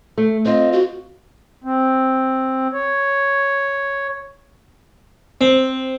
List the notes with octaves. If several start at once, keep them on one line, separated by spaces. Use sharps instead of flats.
A3
C4 F4 D#5
F#4
C4
C#5
C4